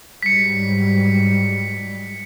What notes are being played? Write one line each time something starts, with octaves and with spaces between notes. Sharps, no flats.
G#2 F#3 G3 B6 C#7